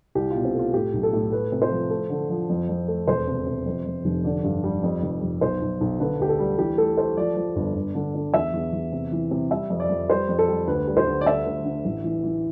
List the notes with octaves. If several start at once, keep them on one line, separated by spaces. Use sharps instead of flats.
C2 G4
B2 F4
C4
A3 F4
A2 G4
B1
A4
A2
A3 B4
C3
C5
F3
A3
D3
F3
F2
F2
A3
E1 C5
C3
C3
F2
F2
F1
D3 D5
G2
G3
F2
F1
F1
B1 C5
B1
B1
D3 B4
D2 G4
A4
G3
E3 G4
A3 A4
A3 C5
F3 D5
F3
G1
G1
D3
D3
E2 E5
E2
E2
C3
E3
C3
G3 E5
F2
D5
F2
G3 C5
F2
A4
G3
D2 B4
G3
C5
D2
D5
D3 E5
D2
D3
A1
E3
E3